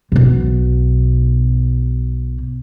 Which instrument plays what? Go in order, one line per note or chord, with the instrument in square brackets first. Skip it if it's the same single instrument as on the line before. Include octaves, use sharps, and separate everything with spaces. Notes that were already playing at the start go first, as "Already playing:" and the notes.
[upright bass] B1 B2